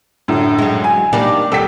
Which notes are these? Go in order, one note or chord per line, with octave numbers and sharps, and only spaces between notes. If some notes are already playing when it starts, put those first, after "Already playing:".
F#2 A2 D3
F#3 G#3
G#5
D#3 G3 A#3 D4
D#1 A4 G5 B6